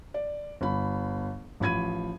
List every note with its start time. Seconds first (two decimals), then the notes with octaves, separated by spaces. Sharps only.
0.14 D5
0.61 G1 B5
1.60 A1 F3 B5 G#6 D#7